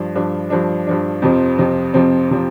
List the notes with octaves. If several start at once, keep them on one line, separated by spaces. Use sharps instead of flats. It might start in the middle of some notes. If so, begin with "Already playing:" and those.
Already playing: G2 F3 D4
G2 F3 D4
G2 F3 D4
G2 F3 D4
F2 C3 F3 C4
F2 C3 F3 C4
F2 C3 F3 C4
C3 F3 C4